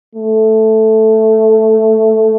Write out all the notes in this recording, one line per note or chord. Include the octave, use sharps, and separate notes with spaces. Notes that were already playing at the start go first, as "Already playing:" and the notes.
A3